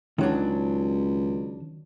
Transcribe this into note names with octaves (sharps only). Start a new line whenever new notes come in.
C#2 D#3 F#3 D4